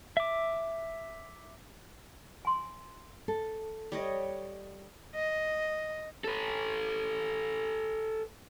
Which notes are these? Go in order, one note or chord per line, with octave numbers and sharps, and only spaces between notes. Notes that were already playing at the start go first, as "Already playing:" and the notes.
E5 D6
G#5 C6
A4
G3 C#5 D#5
D#5
A4 B4